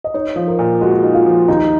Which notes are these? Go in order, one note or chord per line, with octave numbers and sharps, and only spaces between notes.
D#5
D#4 C#5
F3
A#4
A#2
G#3 F#4
D#4
F4
F3
D#2 D#4